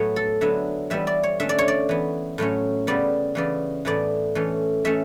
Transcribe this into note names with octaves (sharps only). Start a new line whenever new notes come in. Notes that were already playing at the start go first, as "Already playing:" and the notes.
Already playing: A2 F#3 A3 B3 C#5
A4
D3 F#3 B3 E5
E3 G3 B3 E5
D5
C#5
D3 A3 C#4 E5
D5
C#5
D5
E3 B3
A2 F#3 A3 C#4
C#3 G3 B3 D5
C#3 E3 B3 D5
A2 E3 B3 D5
E3 A3 C#4
E3 A3 C#4 E5